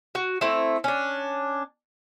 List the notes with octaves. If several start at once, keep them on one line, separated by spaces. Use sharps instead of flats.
F#4
A3 C4 E4
C#4 D4